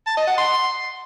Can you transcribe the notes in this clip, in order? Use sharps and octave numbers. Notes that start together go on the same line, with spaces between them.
A5
D#5
F#5
C6